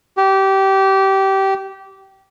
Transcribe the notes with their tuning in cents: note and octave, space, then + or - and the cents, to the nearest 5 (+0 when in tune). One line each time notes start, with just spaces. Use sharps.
G4 -20